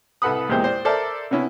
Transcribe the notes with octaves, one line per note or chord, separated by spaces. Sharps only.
C2 A4 B4 F#5 B5 D#6
E2 A#2 G#3 G4 C5 G5
C5 D5
A4 A#4 C5 D5 E5 A5
C3 B3 C#4 E4